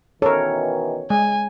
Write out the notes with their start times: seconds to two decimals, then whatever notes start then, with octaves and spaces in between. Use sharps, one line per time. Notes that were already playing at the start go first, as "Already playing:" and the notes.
0.22 B2 D#3 E3 A4 A#4 C#5
1.10 G#3 G#5